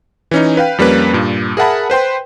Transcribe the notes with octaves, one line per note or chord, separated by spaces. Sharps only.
E3 C#4 D#4
B4 F5 G5
F2 G3 A#3 C#4 B4
G2 A#2
G#4 A#4 E5 F#5 A5 B5
B4 C5 G5 C6